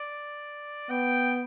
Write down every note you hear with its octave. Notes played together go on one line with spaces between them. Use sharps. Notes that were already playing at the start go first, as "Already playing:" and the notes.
Already playing: D5
B3 G5